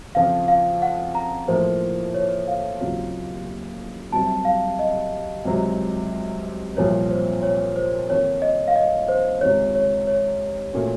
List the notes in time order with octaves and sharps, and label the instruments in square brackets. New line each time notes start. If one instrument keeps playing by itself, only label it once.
[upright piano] F2 C#3 F3 [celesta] F5
[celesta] F5
F#5
A#5
[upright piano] A2 F3 A#3 [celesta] C5
[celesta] C#5
F5
[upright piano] D#2 C#3 F#3 C4 F4
[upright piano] C2 C3 F#3 C4 [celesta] A5
[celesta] F5
D#5
[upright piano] C#2 C3 F#3 C4
[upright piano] C2 A#2 F3 C4 [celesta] C#5
[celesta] C5
C#5
C5
[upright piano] F2 D#3 A#3 D#4 [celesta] C#5
[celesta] D#5
F5
D#5
C5
[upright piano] C#2 C3 D#3 [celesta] C#5
[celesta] C#5
C#5
[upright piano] A#2 A3 C#4 F#4